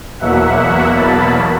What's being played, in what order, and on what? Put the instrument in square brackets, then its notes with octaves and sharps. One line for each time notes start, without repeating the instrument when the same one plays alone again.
[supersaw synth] E2 B2 F#3 A#3 E5 F#5
A5 B5